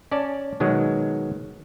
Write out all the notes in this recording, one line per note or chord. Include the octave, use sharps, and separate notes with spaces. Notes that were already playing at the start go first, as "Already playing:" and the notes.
C#4 D5 A5
B2 D#3 F#3 G#3